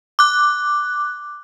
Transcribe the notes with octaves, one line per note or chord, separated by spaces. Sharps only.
D6 F#6